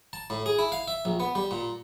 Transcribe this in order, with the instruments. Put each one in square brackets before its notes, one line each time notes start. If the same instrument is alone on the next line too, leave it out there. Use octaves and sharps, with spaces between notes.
[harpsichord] A5
A2
G#4
E4
F5
E5
A#1
B3
G3
A#2